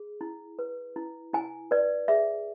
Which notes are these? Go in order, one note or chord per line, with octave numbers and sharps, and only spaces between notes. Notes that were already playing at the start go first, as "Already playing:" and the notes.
Already playing: G#4
E4
B4
E4
E4 G#5
B4 D5
G#4 E5